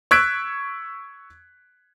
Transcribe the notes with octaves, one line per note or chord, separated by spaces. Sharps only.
C#6 E6 F#6 G#6 B6 D7